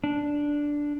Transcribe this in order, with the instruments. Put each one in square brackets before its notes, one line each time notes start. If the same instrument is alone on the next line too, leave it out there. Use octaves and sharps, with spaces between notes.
[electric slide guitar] D4